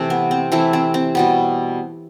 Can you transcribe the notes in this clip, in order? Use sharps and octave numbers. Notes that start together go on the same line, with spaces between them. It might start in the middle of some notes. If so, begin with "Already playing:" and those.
Already playing: C3 E3 A3
B3
C4
C3 E3 A3 C4 E4
C4
C4
B2 G3 B3